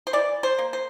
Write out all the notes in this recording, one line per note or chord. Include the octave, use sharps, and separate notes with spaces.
C5
E3 D5
C5
A#3
C5